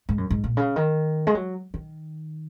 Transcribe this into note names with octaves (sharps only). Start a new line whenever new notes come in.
G#2
F#2
G#2
A#2
C#3
D#3
G#3
F#3
D#3